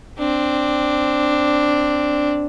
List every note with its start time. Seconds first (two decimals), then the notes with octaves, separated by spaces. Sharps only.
0.18 C4 D4